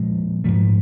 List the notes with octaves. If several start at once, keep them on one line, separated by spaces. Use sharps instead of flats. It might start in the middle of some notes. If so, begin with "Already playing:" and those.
Already playing: A#2 F3 G#3
G#2 F3 A3